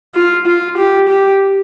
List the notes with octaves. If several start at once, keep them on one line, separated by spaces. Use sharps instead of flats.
F4
F4
G4
G4